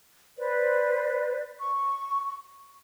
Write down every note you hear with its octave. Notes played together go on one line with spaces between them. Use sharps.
B4 C5 D5
C#6